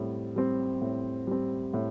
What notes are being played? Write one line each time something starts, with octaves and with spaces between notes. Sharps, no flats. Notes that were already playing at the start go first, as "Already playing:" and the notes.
Already playing: A2 G3 C4
G3 C4
A2
G3 C4
A2